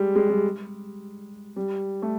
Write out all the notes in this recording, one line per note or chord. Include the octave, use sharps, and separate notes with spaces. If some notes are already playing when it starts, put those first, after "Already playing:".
Already playing: G3 G#3
G#3
G3
G3
A3